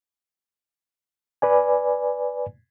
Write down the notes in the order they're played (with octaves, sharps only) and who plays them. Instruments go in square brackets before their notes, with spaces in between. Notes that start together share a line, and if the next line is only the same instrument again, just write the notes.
[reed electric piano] B4 D5 G#5